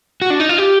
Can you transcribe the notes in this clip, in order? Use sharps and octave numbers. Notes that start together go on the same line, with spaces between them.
F#4
D4
D#4
F4
G4